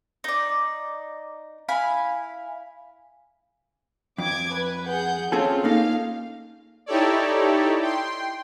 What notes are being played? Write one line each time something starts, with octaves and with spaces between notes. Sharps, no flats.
D#4 D5
E4 F5 G#5 B5
F2 D6 G#6
B4
G#4 F#5 G6
C4 C#4 F4 G#4 A4
A#3 D#4 A4 F5
D#4 E4 G4 A4 C#5 D5
G5 C6